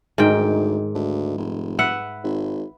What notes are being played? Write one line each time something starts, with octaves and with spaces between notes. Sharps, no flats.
D2 G#2 D#3 G5
D2
F1
B4 E5 F#5
G#1